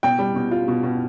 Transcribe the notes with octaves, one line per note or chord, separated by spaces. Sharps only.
B2 G5
G3
B2
F4
B2
B2